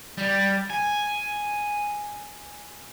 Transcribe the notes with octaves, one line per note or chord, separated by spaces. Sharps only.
G3
G#5